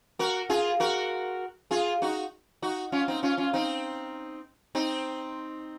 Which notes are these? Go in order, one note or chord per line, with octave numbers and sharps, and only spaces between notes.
F#4 A#4
F4 G#4
F#4 A#4
F4 G#4
D#4 F#4
D#4 F#4
C#4 F4
C4 D#4
C#4 F4
C#4 F4
C4 D#4
C4 D#4